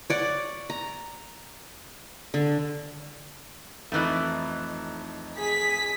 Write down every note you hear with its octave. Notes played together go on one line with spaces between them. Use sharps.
C#5 D5 F#5
A#5
D3
F2 A2 E3 A3 D#4 F#6
G#4 B6